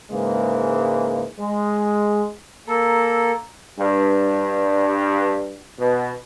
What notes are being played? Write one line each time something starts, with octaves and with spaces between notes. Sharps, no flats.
G#2 C#3 E3 G#3 A#3
G#3
A#3 A4 A#5 E6
G2
B2